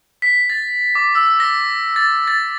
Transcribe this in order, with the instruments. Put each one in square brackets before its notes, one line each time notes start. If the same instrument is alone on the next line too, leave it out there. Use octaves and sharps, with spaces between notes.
[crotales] B6
A6
D6
E6
A#6
A6
A6